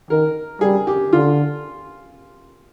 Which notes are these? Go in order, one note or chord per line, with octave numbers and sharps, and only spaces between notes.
D#3 A#4
G3 G#4
G4
D3 F4